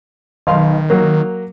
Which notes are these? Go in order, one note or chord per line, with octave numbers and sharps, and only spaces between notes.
B1 D#3 F5 C6
F#3 A#3